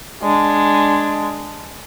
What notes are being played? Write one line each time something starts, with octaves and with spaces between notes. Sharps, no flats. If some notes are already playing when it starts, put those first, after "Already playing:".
G#3 D4